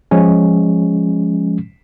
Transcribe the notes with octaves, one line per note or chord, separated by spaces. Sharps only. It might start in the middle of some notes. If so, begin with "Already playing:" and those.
F3 G#3 C#4